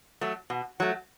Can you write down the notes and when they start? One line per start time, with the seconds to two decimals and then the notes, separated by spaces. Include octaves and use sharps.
0.21 F#3 A3
0.50 B2
0.80 F#3 A3